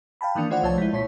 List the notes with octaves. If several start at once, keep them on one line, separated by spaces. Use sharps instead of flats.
F5 G5 A5 B5
D#3 E3 A#3 D4
A3 F4 C5 D5 F#5
C2 F3 C#5 A5
G#3 E4
A#2 C#5 C#6 B6